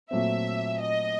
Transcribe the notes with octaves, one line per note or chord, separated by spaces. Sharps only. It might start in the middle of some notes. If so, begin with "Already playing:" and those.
A#2 F#3 A3 C4 E5
D#5